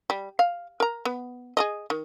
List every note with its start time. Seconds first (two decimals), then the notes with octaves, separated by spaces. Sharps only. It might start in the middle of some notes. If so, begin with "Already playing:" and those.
0.10 G3
0.39 F5
0.80 A#4 A#5
1.05 B3
1.57 G#4 A#4 D#5
1.90 D#3